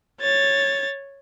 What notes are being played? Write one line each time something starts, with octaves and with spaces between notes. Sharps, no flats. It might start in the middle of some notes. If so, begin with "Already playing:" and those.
C#5 A6